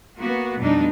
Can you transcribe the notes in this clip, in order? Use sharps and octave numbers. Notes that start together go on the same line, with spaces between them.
A#3 B3 F#4
F2 B2 G3 A3 D4 D#4